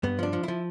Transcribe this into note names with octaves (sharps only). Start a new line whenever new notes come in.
G2 B3
F3 D4
F3
F3 E4